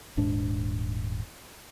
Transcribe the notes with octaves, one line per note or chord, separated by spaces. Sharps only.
D#1 G#2 D4